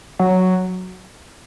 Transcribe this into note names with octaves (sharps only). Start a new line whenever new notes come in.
F#3